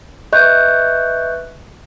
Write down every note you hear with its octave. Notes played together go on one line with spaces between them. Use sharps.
B4 D#5 E5 C#6 F#6 G6